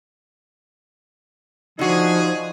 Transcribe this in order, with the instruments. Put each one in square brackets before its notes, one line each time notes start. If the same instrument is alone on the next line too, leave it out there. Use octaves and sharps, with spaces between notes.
[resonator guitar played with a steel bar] D3 F#4 [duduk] F3 [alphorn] D#4 [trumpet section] G#4